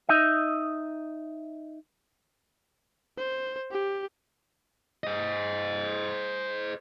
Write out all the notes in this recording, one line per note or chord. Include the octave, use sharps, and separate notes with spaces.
D#4 D#5 E5
C5
G4
C5 D#5